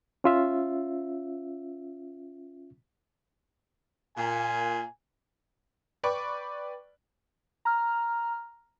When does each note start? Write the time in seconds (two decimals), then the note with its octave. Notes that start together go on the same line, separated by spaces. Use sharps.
0.24 C#4 F4 E5
4.17 A#2 G#5
6.03 B4 D5 G5 B5 C#6 D6
7.65 A#5 F6